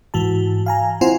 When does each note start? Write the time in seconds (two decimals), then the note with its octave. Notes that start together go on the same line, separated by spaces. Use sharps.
0.14 G#2 E3 F#4 A5
0.66 F5 G#5 A#5
1.01 C4 E4 F4 C5 F#5 G#5